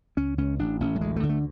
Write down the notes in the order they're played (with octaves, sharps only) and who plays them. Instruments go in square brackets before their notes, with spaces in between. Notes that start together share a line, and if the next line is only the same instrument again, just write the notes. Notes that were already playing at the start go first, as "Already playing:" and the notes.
[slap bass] C#2 C#4
C#2 C#4
A1 D4
A1 C#4
F#3
D2 G#3
A3
D3
A3